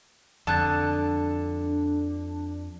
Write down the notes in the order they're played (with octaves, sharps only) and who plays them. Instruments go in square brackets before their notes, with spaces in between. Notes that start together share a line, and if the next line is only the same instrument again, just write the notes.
[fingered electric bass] F2 [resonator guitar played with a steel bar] D3 [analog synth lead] D4 [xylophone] A5 F#6 A6